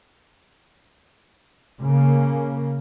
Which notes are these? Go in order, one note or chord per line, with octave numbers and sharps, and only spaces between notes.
C#3 A#3